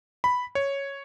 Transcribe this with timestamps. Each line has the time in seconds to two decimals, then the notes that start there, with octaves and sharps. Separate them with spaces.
0.24 B5
0.55 C#5